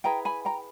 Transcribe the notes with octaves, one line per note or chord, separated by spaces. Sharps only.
E4 G#4 B4 G5 A#5
G#5 B5
G5 A#5